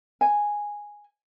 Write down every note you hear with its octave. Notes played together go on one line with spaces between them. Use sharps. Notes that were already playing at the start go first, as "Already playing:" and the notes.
G#5